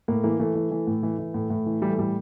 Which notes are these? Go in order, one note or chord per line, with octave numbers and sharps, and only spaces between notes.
A2 A#3
E3 A#3
E3 A3
E3
E3
A2
E3
E3
A2
A2
E3
E3 G3
A3
A2 G3